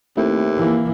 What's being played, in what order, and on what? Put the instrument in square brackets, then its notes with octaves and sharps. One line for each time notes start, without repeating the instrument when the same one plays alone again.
[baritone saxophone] D#2 [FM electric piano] A3 C4 E4
[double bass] E3 A#3